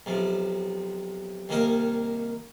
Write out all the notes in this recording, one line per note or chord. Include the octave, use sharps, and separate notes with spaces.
B1 C3 F3
C2 D#3 A#3 D#4 A#4 F5